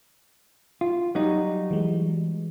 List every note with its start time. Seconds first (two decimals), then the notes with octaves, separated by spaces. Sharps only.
0.81 F4
1.15 F#3 G3 D#4
1.71 E3 G#3